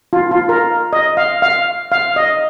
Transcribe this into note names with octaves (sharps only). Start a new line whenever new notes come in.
F4
F4
A#4
D#5
F5
F5
F5
D#5